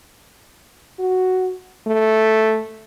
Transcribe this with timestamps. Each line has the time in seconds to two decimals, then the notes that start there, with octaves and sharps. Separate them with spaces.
0.99 F#4
1.87 A3